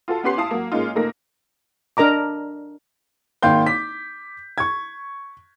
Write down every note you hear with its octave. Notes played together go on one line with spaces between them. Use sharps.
F4 F#4 A4
B3 C#4 G4 B4 C6 C7
E4 F5 A5 D#6
F#3 A#3
G#3 A#3 C#4 D#4 F4
F1 A3 A#3 D#4 A#4 A#6
D4 A#4 D#5 A#5 D6
G#1 A#3 F5 G5 C6 G6
D6 B6
C#6 G#6